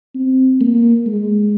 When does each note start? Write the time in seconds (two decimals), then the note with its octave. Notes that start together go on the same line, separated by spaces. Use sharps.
0.15 C4
0.61 A#3
1.07 G#3